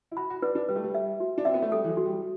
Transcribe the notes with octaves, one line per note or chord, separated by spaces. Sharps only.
E4
F#4 B5
F#4
D4 B4
D4
G3 B4
A3
G3
E5
F#4
D4
C4 E5
B3
A3
G3 A4
E3
F#3
F#4
G3